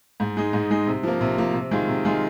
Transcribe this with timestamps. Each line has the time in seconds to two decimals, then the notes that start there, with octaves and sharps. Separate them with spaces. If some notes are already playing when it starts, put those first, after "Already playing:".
0.20 G#2
0.37 G#3 D#4
0.53 G#2
0.70 G#3 D#4
0.87 C3
1.03 F3 A#3
1.21 C3
1.38 F3 A#3
1.54 C3
1.71 D#3 G#3 F4
1.88 C3
2.05 D#3 G#3 F4